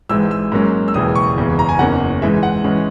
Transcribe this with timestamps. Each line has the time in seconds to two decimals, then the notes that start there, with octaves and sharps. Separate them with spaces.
0.09 G#1 G#2 E3 E6
0.31 E6
0.52 G#2 F#3 A#3 C#4
0.88 E6
0.94 E1 D#2 C#3 E3 D#6
1.15 C#6
1.36 F#1 E2 C#3 E3
1.59 A#5
1.69 G#5
1.79 F#1 E2 D#3 A#3 C#4 F#5
2.22 G#2 E3 G#3 E5
2.43 F#5
2.64 G#2 E3 G#3 C#4